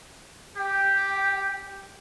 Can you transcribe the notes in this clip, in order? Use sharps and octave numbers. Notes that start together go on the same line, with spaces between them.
G4 G5